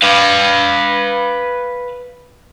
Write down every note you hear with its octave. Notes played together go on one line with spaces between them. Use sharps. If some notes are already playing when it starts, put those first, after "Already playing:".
B4 F5